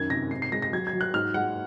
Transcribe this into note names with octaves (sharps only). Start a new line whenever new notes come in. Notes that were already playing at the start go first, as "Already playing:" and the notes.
Already playing: F#2 D#3 G#6
C3 A#6
G#2 C7
C7
G#3 A#6
A#6
F#3 G#6
G#6
F#3
F#6
G#2 F6
G#3 F#5